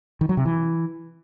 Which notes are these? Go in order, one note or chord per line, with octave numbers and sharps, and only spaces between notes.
D#3
F#3
C3
E3